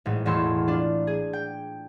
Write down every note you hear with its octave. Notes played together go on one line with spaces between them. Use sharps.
A1 G#2
E1 E2 A3 C6 C#6 E6
D4 F4
G#4
G5